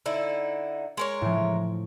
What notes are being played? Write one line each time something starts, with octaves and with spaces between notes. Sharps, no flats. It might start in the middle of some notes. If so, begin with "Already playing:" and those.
D3 D#4 E4
G#3 A#4 C#5
A2 F3